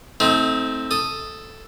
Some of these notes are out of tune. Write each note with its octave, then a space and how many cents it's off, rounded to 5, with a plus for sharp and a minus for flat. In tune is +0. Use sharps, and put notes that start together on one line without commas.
A3 +0 C4 +0 D#4 +40
A4 +0 D#6 +0